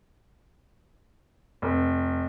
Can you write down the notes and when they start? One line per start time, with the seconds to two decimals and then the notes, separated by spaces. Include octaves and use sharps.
1.62 F1